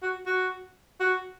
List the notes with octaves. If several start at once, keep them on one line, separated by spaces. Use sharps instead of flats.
F#4
F#4
F#4